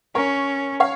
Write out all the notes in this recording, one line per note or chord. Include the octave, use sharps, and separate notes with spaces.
C#4 A#4 C#5
C#5 F5